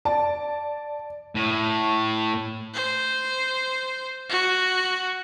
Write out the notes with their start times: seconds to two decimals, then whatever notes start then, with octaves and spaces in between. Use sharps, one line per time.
0.05 D5 A5
1.35 A2
2.74 C5
4.30 F#4